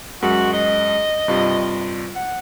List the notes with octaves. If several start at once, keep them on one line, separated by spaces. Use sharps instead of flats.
F#2 G#3 F#4
D#5
G2 C3 F4
F#5